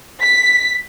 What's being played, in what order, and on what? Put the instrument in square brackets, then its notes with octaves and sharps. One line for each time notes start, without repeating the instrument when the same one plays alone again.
[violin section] B6